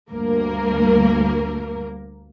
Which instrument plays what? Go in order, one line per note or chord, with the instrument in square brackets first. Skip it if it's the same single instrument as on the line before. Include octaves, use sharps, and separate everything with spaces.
[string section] D2 G2 A#3 A#4